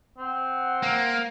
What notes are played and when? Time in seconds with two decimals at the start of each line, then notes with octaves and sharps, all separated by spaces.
0.18 C4 F#5
0.83 A#3